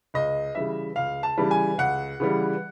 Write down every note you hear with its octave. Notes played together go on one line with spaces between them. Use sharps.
C#2 D#5
C#3 E3 G3 E5
C#2 F5
A5
C#3 E3 G3
G#5
C#2 F#5
C#3 E3 G3